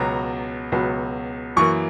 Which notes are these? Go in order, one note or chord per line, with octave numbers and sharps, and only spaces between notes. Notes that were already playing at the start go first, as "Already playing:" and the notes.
Already playing: C#2 B2 F#3 B3 A#5
C#2 B2 F#3 B3
F#2 E3 A#3 C#6